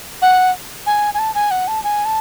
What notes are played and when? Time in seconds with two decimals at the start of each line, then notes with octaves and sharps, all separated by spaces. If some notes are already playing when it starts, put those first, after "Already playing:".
0.22 F#5
0.86 G#5
1.14 G#5
1.19 A5
1.35 G#5
1.51 F#5
1.68 A5
1.84 G#5
2.05 A5